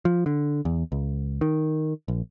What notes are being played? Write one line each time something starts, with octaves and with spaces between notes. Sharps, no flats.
F3
D3
E2
C#2
D#3
A#1